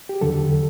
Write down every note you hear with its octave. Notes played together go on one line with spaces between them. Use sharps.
G4
E2 D3 F#3 A4